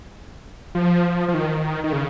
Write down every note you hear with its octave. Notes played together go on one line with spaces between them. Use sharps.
F3
F3
D#3
D#3
C#3